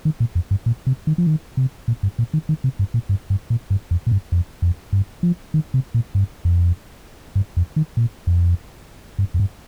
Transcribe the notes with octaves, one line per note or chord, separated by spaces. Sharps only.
D#3
A#2
F2
G2
A#2
C3
D#3
F3
D#3
C3
A#2
G2
A#2
D#3
D#3
C3
G2
A#2
G2
G2
A#2
G2
F2
A#2
G2
F2
F2
G2
F3
D#3
C3
A#2
G2
F2
G2
F2
D#3
A#2
F2
G2
F2
G2